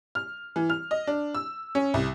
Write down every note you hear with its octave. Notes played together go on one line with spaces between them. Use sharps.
F6
E3
F6
D#5
D4
E6
C#4
C2